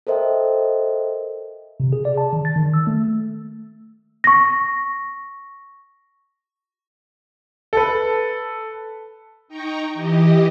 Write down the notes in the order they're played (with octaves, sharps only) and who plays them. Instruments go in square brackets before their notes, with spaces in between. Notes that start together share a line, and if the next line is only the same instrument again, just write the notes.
[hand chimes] A4 A#4 C5 D#5 E5 G5
[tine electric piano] C3
G#4
D5
A5
D#3
A6
D#3
E6
A3
[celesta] C#6 A#6
[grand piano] A4 B4
[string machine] D#4 G5 A#5 C#6
E3 G4 D#5